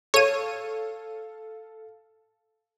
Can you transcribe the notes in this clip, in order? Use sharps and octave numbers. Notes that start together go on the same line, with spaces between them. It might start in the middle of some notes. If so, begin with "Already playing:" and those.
A4 C#5 F5 D#7